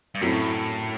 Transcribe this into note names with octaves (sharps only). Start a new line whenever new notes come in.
G2
F#2 A2 F#3 A3 C4 E4